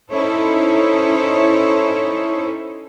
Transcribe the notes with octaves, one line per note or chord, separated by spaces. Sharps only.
C#4 D#4 E4 A4 C5 C#5